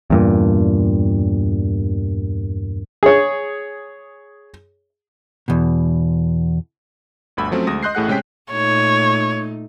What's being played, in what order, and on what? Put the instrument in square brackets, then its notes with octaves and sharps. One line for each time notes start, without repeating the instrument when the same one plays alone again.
[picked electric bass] E2 G2 A#2
[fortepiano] G#4 C#5
[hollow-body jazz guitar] E2 B2
[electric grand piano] G1 D2 B5 E6
F3 F#3 A3 C4 C#4
D2 G#3 D#6 A#6
D#5 C6 F#6 G6 C7
A1 A2 A3 G#4 F#5 F#6
C3 G#3 C#4 G5 B6
[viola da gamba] A#2 A3 D#4 [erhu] C#5